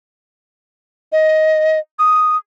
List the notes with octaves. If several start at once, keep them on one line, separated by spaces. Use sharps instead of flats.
D#5
D#6